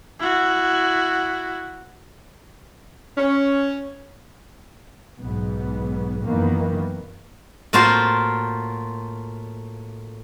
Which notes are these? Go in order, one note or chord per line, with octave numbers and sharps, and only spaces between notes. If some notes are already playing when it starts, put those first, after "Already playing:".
E4 F#4
C#4
B1 G#2 B3
F#2 D#3 E3 A#3 B3
A2 A#3 F4 F#4 C5